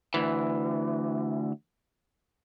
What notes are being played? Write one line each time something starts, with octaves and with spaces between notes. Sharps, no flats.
D2 E3